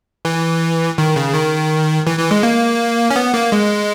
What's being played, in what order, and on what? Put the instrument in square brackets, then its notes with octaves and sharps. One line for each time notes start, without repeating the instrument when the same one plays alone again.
[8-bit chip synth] E3
D#3
C#3
D#3
E3
E3
G#3
A#3
C#4
B3
A#3
G#3